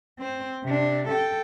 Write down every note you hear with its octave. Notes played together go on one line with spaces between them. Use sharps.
C4 C5
C3 D4
A4 G5